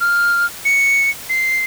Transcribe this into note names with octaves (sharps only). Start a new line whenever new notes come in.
F6
C#7
C7